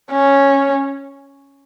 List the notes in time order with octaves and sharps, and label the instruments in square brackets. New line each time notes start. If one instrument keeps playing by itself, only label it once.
[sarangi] C#4